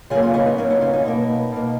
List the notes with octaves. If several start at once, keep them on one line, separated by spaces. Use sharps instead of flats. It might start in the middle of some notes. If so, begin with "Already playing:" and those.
C#3 F#3 A#3 F4 G#4
C#4 F4
B3 D#4
B3 D#4
C#3 F#3 A#3 C#4
B3 D#4
C#4 F4
B3 D#4
B2 A#3
B2 A#3